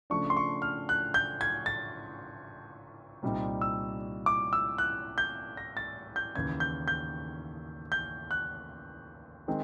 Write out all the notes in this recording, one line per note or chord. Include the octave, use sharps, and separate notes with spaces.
C#3 F3 A3 D4 C#6
C6
C#6
F6
F#6
G6
G#6
A6
C2 A#2 G3 C4 D#4
E6
D6
E6
F#6
G6
A#6
A6
G6
D#2 C#3 E3 G#6
G6
G6
G6
F#6
D#3 G#3 C4 D#4